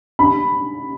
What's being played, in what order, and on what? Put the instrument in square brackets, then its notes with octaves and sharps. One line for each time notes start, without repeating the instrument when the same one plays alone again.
[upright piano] B5